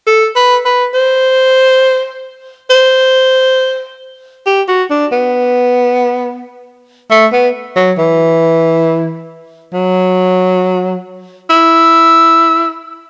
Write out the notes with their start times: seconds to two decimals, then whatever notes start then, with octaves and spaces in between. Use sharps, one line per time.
0.07 A4
0.36 B4
0.65 B4
0.94 C5
2.70 C5
4.46 G4
4.68 F#4
4.90 D4
5.12 B3
7.11 A3
7.33 B3
7.76 F#3
7.98 E3
9.74 F#3
11.50 E4